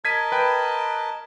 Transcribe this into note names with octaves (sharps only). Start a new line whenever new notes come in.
A#4 D#5 A5 G#6 B6 D#7
B4 G5